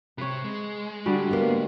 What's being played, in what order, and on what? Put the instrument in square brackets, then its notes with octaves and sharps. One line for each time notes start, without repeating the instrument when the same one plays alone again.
[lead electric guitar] C3 [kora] B4 C#5
[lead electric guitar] G#3
[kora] D3 G3 F#4
[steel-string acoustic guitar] A#3 B3